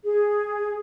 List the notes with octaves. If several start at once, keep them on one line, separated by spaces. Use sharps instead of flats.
G#4